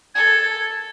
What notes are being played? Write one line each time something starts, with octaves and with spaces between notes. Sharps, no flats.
A4 G#6